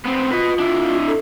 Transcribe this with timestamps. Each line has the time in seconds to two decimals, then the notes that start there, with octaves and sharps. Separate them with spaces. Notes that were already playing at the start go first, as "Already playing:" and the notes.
0.06 B3 C4
0.32 F4 B4 D#5
0.60 D4 E4
1.07 A4